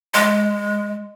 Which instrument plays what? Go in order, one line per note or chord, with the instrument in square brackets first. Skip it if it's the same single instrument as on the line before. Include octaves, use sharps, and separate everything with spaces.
[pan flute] G#3